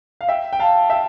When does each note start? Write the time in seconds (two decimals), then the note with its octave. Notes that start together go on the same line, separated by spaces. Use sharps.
0.21 F5
0.29 E5 G5
0.53 G5
0.60 F5 A5
0.90 E5 G5